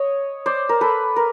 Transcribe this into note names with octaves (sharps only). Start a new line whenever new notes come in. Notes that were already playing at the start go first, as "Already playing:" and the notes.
Already playing: C#5 D#5
C5 D5
A#4
A4 B4
A#4